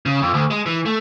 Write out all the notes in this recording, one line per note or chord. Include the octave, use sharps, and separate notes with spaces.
C#3
F2
D2
G#3
E3
A3